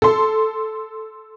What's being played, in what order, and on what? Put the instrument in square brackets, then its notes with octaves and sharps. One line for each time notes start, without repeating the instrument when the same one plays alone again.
[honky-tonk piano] A4 C6